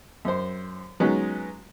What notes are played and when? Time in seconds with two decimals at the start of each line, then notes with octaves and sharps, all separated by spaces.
0.25 F#2 C5
1.00 F#3 G#3 B3 C#4 D#4